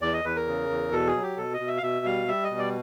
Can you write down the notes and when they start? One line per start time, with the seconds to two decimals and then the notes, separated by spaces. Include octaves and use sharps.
0.01 E2 D5
0.13 D#5
0.24 E2 B4
0.36 A#4
0.48 C#3
0.69 E2
0.92 B2 A4
1.07 G#4
1.15 F#3
1.22 G4
1.37 B2 A4
1.53 D#5
1.60 B2
1.67 E5
1.77 F5
1.83 B2 E5
2.06 G3 F5
2.28 G3 E5
2.44 D#5
2.51 B2
2.59 D5